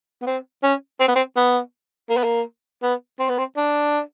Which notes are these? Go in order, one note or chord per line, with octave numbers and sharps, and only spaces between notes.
B3
C4
C#4
C4
B3
C4
B3
A#3
B3
A#3
B3
C4
B3
C4
D4